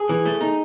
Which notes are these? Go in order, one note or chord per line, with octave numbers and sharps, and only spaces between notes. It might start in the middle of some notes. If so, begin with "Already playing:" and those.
Already playing: G#4
E3
A3
D#4